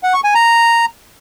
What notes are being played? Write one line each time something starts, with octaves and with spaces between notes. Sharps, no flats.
F#5
C#6
G#5
A#5